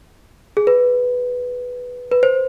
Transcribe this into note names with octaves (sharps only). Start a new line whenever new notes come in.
G#4
B4
B4
C5